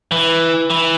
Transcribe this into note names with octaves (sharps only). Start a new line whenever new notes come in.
E3
E3